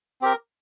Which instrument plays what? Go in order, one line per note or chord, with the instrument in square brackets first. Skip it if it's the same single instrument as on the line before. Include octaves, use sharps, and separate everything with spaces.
[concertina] C4 G4 A#4